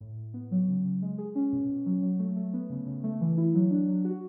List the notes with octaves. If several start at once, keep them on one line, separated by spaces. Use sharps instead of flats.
A2
A2
B3
F#3
C#3
C#3
G#3
G#4
C#4
B2
B2
F#3
F#3
A3
A3
B3
C#3
C#3
A3
E3
E4
F#3
D4
F#3
F#4